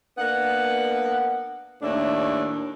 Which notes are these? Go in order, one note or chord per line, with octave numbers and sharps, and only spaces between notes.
A#3 B3 D4 F#5
D#2 A2 A3 D4 E5